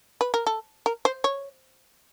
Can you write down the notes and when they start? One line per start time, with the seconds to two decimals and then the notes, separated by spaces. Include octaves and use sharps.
0.21 B4
0.34 A#4
0.47 A4
0.86 A#4
1.05 C5
1.24 C#5